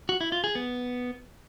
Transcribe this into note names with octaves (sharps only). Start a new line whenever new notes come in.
F#4
E4
F4
G#4
B3